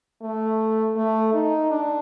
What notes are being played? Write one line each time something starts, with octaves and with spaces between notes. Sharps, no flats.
A3
A3
D#4
D4